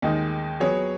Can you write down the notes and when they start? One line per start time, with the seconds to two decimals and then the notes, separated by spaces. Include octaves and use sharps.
0.02 D#2 D#3 G#3 D#4
0.60 F#3 B3 G#4 C#5